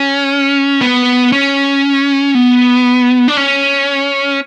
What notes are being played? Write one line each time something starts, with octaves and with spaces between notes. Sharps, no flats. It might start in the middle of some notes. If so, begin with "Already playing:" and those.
Already playing: C#4
B3
C#4
B3
D4
C#4